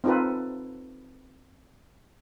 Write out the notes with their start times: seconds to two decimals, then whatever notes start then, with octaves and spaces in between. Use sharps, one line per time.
0.04 C4 D#4 F4 A4 B4